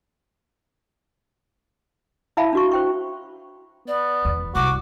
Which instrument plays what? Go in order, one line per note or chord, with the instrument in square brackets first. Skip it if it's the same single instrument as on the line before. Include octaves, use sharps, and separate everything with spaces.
[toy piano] E4 E5 F5 A5 B5
D4 F#4 C#6
C5 G5 C#6
[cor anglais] B3 [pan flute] D5
[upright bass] E2
[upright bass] C2 [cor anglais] F#4 [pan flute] D6